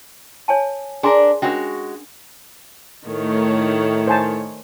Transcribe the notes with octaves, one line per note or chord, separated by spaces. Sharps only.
C#5 G#5 A5
D4 G#4 A#4 G#5 C6
G#3 C#4 D4 F#4 A#4 C#5
A2 D#3 A3 C#5
C5 G#5 A5